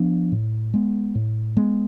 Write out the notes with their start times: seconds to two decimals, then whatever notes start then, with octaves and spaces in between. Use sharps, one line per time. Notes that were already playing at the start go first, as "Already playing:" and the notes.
Already playing: F3 B3 D4
0.32 A2
0.74 G#3 B3
1.15 A2
1.57 G#3 B3